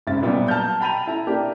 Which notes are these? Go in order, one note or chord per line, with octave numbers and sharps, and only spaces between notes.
G#1 C#3 E5 A6
A#2 F#3 G3 B3 D4
A5 A#5 F6 G6
G5 A#5 B5 A6 D#7 F7
E4 A5 A#5
A#3 D4 G4